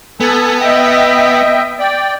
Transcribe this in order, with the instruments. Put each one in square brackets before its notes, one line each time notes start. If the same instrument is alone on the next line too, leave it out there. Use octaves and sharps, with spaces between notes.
[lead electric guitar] B3 [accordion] A4 G#5
[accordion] D#5 E5 G5
D5 G5